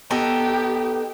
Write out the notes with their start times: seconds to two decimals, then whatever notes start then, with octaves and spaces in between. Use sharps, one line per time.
0.11 B3 D#4 G4 A4